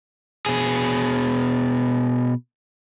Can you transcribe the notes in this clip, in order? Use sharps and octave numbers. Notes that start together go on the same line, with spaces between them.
B2 G#4